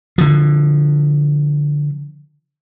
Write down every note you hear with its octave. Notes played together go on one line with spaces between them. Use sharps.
D3 F3